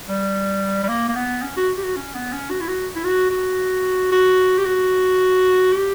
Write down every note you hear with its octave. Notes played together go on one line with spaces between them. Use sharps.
G3
G3
A#3
A#3
B3
C#4
F#4
G4
F#4
C#4
B3
C#4
F#4
E4
F#4
E4
F#4
F#4
F#4
G4
F#4
G4